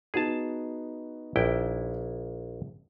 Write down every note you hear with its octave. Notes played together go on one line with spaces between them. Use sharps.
B3 D#4 F#4 G#4 A5
A#1 E4 G5